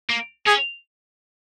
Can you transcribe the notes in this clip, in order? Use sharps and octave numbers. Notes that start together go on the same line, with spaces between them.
A#3
C#4 G#4